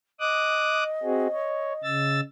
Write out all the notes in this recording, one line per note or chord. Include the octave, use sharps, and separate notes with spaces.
D#5 D6 D#6 F#6
C4 F#4 G#4
C#5
C#3 E6 A6